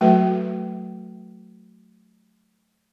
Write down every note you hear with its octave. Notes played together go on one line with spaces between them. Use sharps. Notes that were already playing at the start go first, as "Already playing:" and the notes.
F#3 A3 F#4 A4 B4 E5